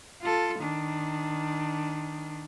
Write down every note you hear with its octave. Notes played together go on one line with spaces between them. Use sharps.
F4 A4
D#3 D4